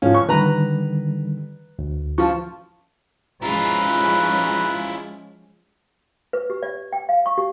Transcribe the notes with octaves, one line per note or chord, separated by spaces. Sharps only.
G#2 F3 C#4 F5
C#6
D3 D#3 G3 B4 A#5
D2
F3 F4 A5 C#6
F3 G#3 C#4 E4 F4 B4 A#5
B4
G4
D5
G5
F5
C#6
G4